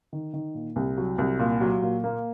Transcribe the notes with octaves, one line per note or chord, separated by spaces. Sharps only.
D#3
D#3
A#2
C2
F#3
C2
A#2
F#3
A#2
A#3